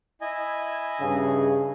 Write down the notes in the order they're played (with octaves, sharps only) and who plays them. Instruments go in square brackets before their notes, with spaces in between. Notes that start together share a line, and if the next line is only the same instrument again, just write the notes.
[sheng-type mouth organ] E4 D#5 G#5
[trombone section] G2 C#3 G#4